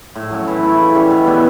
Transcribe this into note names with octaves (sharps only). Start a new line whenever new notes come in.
A2
F#3 C#4
E3
A3 E4
C#3
G3 C#4
B2
G3 B3 E4